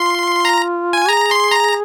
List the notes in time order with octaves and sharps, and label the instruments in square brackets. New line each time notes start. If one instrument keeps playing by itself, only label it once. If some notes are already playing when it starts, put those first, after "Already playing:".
Already playing: [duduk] F4 [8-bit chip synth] C6
[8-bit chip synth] A#5
G#5
[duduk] G#4 [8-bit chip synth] A#5
[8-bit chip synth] C6
A#5